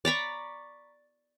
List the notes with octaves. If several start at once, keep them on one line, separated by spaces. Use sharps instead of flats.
D5 A#5 B5 C#6